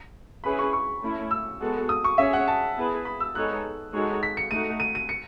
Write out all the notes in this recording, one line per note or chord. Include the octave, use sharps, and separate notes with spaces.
C#4 E4 G#4 B4 B5
C#6
C#6
A3 C#4 E4
E6
G#3 B3 F#4 A4
D#6
C#6
C#4 G#4 C#5 E5
F#5
A5
B3 E4 G#4 B4
B5
E6
G#3 B3 D#4 A4 C#5 F#6
G#3 D#4 F#4 A4 C#5
B6
C#7
A3 D#4 F#4 D#7
D#7
D#7
C#7